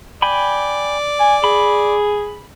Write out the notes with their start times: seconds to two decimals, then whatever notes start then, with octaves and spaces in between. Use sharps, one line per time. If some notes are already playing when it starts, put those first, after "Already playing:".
0.22 D5 G5 G#5 B5
1.20 G#5
1.44 G#4 B5